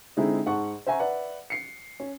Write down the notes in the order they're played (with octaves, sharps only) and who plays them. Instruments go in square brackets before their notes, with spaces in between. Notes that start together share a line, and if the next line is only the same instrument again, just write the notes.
[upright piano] D3 G#3 C4 D#4 E4
G#2 F#5 A5 C#6
C5 E5 F#5 G#5 A#5 C#6
B4 D5 E5 F#5
C7 C#7
C#4